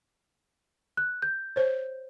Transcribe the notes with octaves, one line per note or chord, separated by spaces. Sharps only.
F#6
G6
C5 C#5